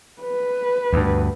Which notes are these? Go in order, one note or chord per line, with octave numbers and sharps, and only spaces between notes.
B4
D2 G2